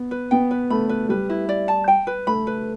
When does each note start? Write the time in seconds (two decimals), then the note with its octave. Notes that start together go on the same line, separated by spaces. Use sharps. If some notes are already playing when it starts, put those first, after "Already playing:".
Already playing: B3
0.11 B4
0.31 B3 G5
0.51 B4
0.70 A3 B5
0.89 B4
1.09 G3 B4
1.30 E4
1.49 D5
1.68 A5
1.88 G5
2.07 B4
2.27 A3 B5
2.47 B4